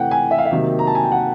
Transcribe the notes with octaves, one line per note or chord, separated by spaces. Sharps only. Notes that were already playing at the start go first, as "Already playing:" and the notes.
Already playing: C3 E3 A3 F#5 G5
G#5
E5
F5
E5
C3 D#3 F#3 A#3
A#5
A5
G#5
G5
F#5